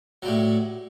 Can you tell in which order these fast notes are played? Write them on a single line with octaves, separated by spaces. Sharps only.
F#3 G3 A2